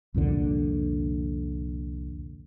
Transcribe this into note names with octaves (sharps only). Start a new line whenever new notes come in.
C2 F2 A#2 D3